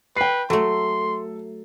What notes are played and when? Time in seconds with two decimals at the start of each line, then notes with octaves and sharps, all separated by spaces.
0.17 B4 G5 C7
0.50 F#3 A3 A4 C6